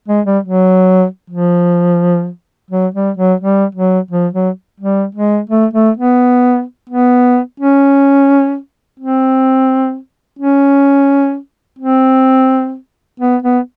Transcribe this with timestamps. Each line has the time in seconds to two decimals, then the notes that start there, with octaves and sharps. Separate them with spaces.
0.08 G#3
0.26 G3
0.44 F#3
1.30 F3
2.71 F#3
2.94 G3
3.17 F#3
3.40 G3
3.75 F#3
4.11 F3
4.33 F#3
4.80 G3
5.15 G#3
5.49 A3
5.74 A3
5.97 B3
6.90 B3
7.60 C#4
8.99 C4
10.39 C#4
11.79 C4
13.20 B3
13.43 B3